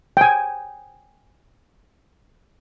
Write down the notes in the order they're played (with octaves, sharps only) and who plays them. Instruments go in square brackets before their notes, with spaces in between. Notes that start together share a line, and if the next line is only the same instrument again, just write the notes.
[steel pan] G5 G#5